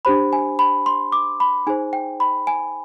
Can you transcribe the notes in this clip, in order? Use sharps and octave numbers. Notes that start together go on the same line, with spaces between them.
D4 G4 C5 B5
G#5
B5
C6
D6
B5
D#4 G#4 C5 G#5
G5
B5
G#5